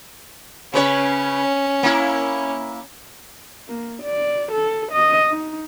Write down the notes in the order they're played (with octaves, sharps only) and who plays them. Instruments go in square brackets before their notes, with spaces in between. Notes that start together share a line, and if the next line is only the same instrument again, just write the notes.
[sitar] C#3 B4 C#5 [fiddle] C#4
[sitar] A#3 E4
[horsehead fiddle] A#3
D5
A4
D#5
D#4